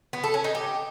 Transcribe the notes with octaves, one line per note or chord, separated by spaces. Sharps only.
B3
A4
C#4
D#4
G4